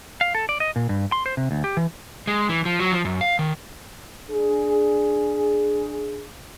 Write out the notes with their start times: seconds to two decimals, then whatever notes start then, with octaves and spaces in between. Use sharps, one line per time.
0.21 F5
0.35 A4
0.49 D5
0.60 D#5
0.76 A#2
0.89 G2
1.12 C6
1.26 C5
1.37 C3
1.51 D2
1.64 G4
1.77 E3
2.27 G#3
2.49 E3
2.65 F3
2.80 F#3
2.92 F3
3.05 F#2
3.21 F5
3.39 D#3
4.29 D4 G#4